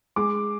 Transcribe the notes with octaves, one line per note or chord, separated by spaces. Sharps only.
G#3 D6